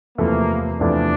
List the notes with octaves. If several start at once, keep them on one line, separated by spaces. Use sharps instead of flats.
E2 C3 F3 A3 A#3 E4
E2 C3 F3 A3 D4 E4